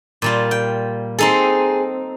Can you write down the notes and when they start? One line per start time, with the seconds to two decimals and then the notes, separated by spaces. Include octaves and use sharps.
0.22 A#2 G3 F4
0.51 G5
1.19 C4 D#4 G#4 A4